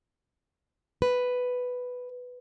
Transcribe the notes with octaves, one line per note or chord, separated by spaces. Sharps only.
B4